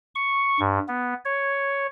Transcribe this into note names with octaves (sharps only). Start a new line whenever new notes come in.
C#6
G2
B3
C#5